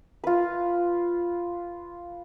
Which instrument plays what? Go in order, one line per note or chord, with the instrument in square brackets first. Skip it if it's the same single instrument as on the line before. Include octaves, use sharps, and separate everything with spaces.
[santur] F4 B4